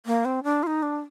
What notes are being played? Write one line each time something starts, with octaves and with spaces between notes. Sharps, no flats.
A#3
C4
D4
F4
D#4
D4